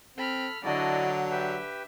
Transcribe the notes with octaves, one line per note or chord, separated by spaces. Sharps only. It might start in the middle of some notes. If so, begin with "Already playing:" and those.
C4 A4 B5 F6
D3 F#3 D4 E4 F#4 D5 D#5
G4 B4 E5 G5